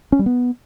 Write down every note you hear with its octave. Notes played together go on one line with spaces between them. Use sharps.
C#4
G3
B3